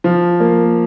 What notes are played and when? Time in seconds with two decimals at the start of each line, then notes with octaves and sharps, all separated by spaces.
0.04 F3
0.40 A#3